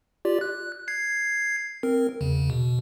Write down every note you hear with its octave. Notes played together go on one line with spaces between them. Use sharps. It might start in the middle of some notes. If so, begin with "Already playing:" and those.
F4 G4 D5
F#6
G#6 C7
C4 A#4
E2 C#3
B2